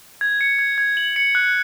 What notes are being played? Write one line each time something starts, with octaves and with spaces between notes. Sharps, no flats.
G#6
C#7
G#6
G#6
F#7
C#7
F#6